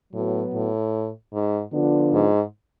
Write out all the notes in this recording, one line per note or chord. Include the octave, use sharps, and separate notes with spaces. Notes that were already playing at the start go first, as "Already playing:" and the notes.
A2 F#3 B3 F#4
A2
G#2
D3 F3 B3 D4 F4
G#2